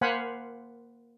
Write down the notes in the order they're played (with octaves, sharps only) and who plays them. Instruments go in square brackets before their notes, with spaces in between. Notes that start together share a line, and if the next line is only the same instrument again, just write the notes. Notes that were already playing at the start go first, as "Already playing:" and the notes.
[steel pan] A#3 C5 F5 F#5 G#5 B5